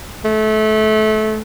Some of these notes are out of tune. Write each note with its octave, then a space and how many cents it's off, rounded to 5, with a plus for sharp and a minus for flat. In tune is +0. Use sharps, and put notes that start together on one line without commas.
A3 -25